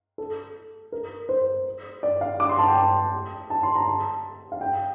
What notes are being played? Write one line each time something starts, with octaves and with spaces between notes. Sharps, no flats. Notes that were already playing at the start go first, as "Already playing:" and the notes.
A4
A#4
C5
D5
F5
D6
C6
A5
G5
A5
A5
C6
A#5
A5
F5
G5